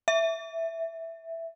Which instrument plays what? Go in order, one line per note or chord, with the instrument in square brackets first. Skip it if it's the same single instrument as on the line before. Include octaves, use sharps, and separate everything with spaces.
[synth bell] E5